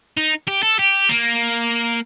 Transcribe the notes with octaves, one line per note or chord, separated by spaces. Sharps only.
D#4
G4
A4
G4
A#3